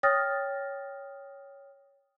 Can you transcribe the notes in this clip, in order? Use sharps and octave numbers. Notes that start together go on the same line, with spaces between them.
C#5 G5 D#6 F6 A6 A#6